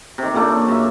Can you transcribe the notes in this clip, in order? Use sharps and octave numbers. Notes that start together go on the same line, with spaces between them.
C3 D#3
A#2 C#3 A3 D4
F#2 E5